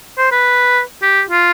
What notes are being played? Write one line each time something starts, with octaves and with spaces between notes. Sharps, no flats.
C5
B4
G4
F4